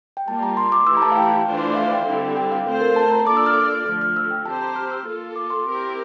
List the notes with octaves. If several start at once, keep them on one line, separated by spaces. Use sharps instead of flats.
G5
G3 A#3 F4 A5
A#5
C6
D6
E3 A3 E4 G4 E6
A#5
A5
F5
G5
E3 A3 D4 F4 C5
E5
F5
G5
D3 G3 C4 E4
G5
F5
A3 C4 F4 A4 C5
A#4
A5
A#5
A#3 D4 F4 A4 D5 D6
E6
F6
D3 F3 A3 F6
F6
E6
G5
C4 G4 C5 A5
A#5
F6
E6
A#3 F4 A4
D6
C6
C4 E4 G4 A#4